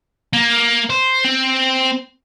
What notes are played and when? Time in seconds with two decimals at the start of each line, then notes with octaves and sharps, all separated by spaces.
0.33 A#3
0.90 C5
1.24 C4